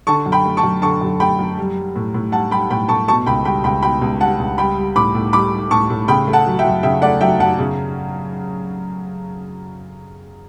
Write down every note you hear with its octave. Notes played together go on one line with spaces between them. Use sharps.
D3 A5 C#6
F#2
G5 B5
A3
A5 C#6
F#2
D3 A5 C#6
F#2
A3 G5 B5
F#2
G3
G3
A2
A2
G3 F#5 A5
G3 G5 B5
A2 G5 B5
A2 A5 C#6
B2 A5 C#6
C#2 G5 B5
G3 G5 B5
C#2 G5 B5
B2 G5 B5
C#2
G3 F#5 A5
C#2
G3 G5 B5
G3
A2 B5 D6
A2
G3 B5 D6
G3
A2 A5 C#6
A2
C#3 G5 B5
A3
F#5 A5
F#3
E5 G5
F#2
C#3 E5 G5
A3 D5 F#5
F#3 E5 G5
F#2 F#5 A5
C#3